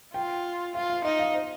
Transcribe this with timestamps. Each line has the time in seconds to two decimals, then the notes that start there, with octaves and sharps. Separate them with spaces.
0.14 F4 G5
0.75 F4 F5
0.90 F5
1.04 D#4 D#5
1.19 F5
1.34 C5